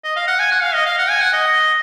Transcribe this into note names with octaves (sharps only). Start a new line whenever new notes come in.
D#5
F5
F#5
G#5
F#5
F5
D#5
F5
F#5
G#5
F#5
D#5